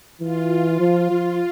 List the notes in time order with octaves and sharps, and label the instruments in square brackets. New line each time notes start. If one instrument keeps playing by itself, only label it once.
[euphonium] E3 [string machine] F4
[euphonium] F3
F3